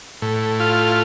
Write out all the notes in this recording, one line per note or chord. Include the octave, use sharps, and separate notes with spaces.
A2
F4